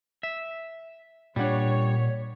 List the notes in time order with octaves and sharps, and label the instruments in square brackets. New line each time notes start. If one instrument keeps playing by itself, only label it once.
[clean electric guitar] E5
[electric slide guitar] A#2 F#5 [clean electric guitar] G3 D4 [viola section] C#5